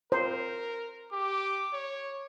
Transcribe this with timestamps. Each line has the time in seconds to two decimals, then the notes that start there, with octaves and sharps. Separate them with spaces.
0.12 A#4 C5
1.13 G4 D6
1.73 C#5